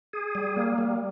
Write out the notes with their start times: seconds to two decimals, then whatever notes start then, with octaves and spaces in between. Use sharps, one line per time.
0.13 G#4
0.35 G3
0.57 A#3
0.78 G3